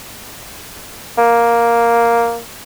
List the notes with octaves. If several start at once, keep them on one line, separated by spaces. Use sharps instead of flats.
A#3